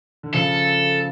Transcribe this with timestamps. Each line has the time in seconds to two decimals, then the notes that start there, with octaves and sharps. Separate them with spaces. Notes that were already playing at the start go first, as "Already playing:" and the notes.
0.23 D3
0.34 C#3 F3 A4